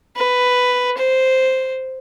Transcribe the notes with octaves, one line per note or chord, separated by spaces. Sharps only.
B4
C5